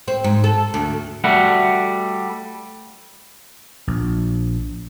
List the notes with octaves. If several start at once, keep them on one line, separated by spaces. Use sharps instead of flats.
C4
G#2
A4
D2
G3 A3 F#4 F#5
A#1